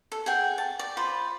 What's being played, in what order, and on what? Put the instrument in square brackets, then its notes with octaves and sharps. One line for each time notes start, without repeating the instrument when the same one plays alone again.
[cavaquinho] A4
G#4 F#5 G5
A5
D5
F4 C5 B5